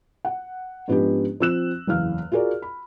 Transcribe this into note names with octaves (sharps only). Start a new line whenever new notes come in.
F#5
G#2 F3 B3 C#4 D4 G4
F3 C4 E6 F#6 E7
F#1 E2 F5 F6
F4 F#4 G#4 A#4 D5
B5